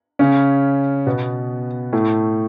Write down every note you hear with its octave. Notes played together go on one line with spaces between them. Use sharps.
C#3 C#4
B2 B3
A2 A3